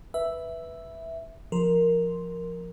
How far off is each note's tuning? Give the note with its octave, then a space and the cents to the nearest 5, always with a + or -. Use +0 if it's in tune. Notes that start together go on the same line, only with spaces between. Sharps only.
B4 +0 E5 +0
F3 +0 A#4 +0 C6 +0